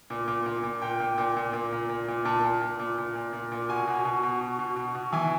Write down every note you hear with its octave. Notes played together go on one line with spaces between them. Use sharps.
A#2
A#2
A#2
A#2
A#2 G5
A#2
A#2
A#2
A#2
A#2
A#2
A#2
A#2 A5
A#2
A#2
A#2
A#2
A#2
A#2
A#2
B2 G#5
B2
B2
B2
B2
B2
B2
B2
E3 G#5